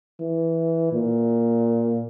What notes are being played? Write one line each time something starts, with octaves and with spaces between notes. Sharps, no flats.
E3
A#2